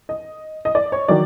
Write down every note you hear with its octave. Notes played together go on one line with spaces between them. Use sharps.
D#5
D#5
D5
C#5
D#3 F#3 D5